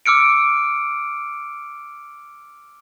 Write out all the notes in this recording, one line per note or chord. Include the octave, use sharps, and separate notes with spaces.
D6 E6 F6 C#7 D7